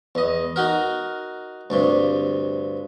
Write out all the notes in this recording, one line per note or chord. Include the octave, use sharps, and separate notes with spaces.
E2 D#5
D#4 F#4 A#4
D2 G2 C3